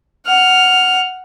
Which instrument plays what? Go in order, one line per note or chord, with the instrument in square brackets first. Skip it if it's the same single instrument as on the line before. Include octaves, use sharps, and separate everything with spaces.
[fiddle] F#5 F6